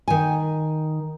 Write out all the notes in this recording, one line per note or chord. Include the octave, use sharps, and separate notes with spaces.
D#3 G#5